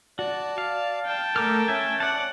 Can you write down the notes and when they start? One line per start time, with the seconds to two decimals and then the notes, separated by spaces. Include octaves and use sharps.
0.19 F#4 D5 A5
0.58 F5
1.06 G5 A5
1.36 A3 A4 A#4 D6 F6
1.68 C#4 E5 G#5
2.00 D5 F#5 A5